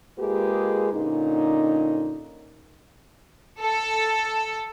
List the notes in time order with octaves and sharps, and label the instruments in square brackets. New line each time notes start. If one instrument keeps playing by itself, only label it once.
[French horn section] G#3 A#3 F4 G4 G#4 B4
A#2 D3 C#4 D#4
[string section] A4